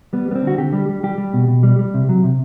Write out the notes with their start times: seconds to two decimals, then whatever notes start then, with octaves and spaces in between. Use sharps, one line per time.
0.13 G3 B3
0.28 G3 B3
0.35 C4
0.43 D3 F#4
0.58 D3 G4
0.73 G3
0.89 G3
1.03 G3 G4
1.18 G3
1.33 B2
1.48 B2
1.63 G3
1.79 G3
1.94 C3
2.09 F#3
2.24 C3